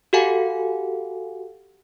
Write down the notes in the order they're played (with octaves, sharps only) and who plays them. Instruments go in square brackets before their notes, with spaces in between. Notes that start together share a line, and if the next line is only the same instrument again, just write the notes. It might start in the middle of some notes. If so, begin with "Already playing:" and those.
[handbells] F#4 G4 A4 F5 F#5 G#5